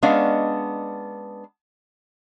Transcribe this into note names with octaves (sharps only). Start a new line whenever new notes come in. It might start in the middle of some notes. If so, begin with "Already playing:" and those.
G#3 B3 C#4 D4 D#5 F5